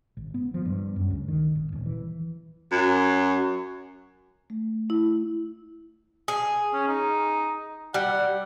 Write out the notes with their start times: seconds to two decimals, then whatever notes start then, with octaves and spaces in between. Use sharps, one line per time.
0.17 G#1
0.34 B3
0.54 F3
0.65 G2
0.96 F#2
1.10 C#2
1.28 D#3
1.55 G#1
1.72 D#1
1.86 E3
2.72 F#2
4.50 A3
4.90 E4
6.28 G#4
6.73 C#4
6.88 D#4
7.94 G3 F#5